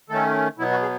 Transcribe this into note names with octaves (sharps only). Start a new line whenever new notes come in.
D#3 A3 C#4 A4
B2 F#3 B3 E4
F#4
G#4